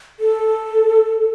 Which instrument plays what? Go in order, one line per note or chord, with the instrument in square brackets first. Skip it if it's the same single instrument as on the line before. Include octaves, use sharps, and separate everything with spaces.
[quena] A4